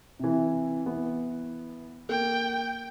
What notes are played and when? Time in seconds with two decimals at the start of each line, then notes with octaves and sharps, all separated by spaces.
0.19 C3 E3
0.86 E3 B3
2.09 A#3 G5